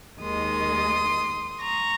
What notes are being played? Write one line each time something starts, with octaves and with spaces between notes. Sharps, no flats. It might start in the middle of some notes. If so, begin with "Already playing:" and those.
D#2 D#3 G#3 C6 D#6
A#5 C#6